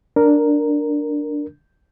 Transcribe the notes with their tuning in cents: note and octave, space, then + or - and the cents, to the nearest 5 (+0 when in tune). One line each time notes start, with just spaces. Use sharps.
D4 +0 A#4 -5